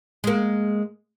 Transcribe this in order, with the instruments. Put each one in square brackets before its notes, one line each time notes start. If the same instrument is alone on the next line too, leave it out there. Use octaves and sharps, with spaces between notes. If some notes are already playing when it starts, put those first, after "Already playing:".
[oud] G#3 A#3